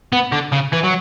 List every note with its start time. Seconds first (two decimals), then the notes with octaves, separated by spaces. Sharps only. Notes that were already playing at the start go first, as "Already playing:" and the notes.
0.13 B3
0.32 D3
0.53 C#3
0.73 E3
0.84 F#3